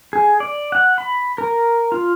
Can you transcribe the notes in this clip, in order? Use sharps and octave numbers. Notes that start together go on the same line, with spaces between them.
G#4
D5
F#5
B5
A#4
F4